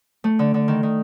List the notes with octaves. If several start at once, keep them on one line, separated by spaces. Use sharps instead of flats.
A3
D3
D3
D#3
D#3